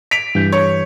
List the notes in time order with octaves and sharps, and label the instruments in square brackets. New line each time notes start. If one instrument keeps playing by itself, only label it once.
[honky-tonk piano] B6 D7 F7
[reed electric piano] G2 E3 G6
[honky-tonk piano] C#5